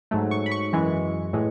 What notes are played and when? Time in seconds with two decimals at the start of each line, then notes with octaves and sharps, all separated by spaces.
0.11 G#2 F#3 A3
0.31 C#6
0.46 B5
0.51 C#6
0.72 F#2 E3 G#3
1.33 A2 E3 G#3